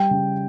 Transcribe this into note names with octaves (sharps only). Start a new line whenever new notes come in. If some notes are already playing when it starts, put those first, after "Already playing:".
Already playing: G3 G5
C#3